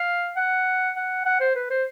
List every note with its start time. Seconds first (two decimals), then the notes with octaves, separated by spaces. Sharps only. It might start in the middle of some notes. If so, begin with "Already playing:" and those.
Already playing: F5
0.37 F#5
0.96 F#5
1.25 F#5
1.40 C5
1.55 B4
1.70 C5